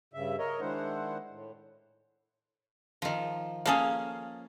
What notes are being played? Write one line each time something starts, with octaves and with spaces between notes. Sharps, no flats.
G2 C#3 E5
A#4 C#5 D#5
D#3 G#3 D4 E4 C5 F#5
A2
D#3 F3
A#3 C#4 G#4 A4 F5